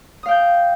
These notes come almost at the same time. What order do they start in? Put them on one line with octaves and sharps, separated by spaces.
D#6 F5 G5 G6